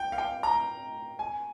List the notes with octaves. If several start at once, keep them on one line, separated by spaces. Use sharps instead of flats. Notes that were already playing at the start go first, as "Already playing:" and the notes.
Already playing: G5
F5
G5
A#5
G#5